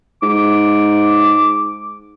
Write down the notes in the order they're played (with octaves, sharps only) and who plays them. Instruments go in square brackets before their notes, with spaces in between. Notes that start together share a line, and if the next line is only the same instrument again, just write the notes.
[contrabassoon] G#2 [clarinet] D6